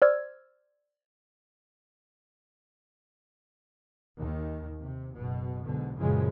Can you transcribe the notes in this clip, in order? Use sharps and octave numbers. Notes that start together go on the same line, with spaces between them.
C5 D5 E6 F6 G#6
D#2 D#3
C3
F#1 B2
B1 G#2 B2 D3
F#2 A#2 C#3 E3 F3 G#3